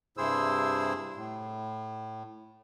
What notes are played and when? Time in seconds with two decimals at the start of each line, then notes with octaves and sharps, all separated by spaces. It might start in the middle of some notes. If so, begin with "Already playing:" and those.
0.17 G2 C3 E4 G#4 C5 E6
1.16 A2